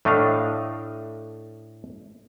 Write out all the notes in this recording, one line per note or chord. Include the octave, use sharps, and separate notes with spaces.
A2 A3 D4 D#5 F5